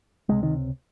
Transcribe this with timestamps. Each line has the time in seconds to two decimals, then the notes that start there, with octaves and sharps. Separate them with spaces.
0.29 C#2 C3 G#3
0.43 D#3